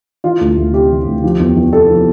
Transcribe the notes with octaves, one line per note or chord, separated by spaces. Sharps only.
E3 F4
D2
D2
C3 G4
E3
D2
F3
E2
E2
C3 A4
F3